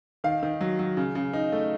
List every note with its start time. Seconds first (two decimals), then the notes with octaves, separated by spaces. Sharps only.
0.24 D#3 F5
0.43 D#3
0.61 F#3
0.79 F#3
0.97 C#3
1.15 C#3
1.33 D#4
1.52 A3